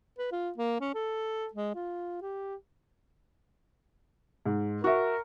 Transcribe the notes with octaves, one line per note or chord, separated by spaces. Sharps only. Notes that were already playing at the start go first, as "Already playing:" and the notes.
B4
F4
A#3
C#4
A4
G#3
F4
G4
G#2
F#4 A#4 E5